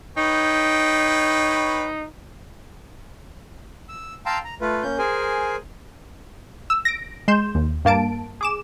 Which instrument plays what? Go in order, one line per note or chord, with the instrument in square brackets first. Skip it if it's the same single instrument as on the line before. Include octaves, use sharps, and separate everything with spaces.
[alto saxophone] D#4 [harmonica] B4 C#5 G5
[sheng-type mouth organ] E6
F5 G5 A5 A#5 C6 E6
A#5
A3 F4 B4
A#3 C#4 G6
G#4 A#4 C5 G#5
[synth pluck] E6
A#6 D7
G#3 C6 G6 E7
D#2
G2 A#3 A5 D7
G#4 D6 E7